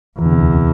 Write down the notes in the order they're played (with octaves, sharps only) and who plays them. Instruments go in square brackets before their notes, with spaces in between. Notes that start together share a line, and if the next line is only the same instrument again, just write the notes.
[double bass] E2 [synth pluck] E3
[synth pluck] D3
C3
D2 D3
C3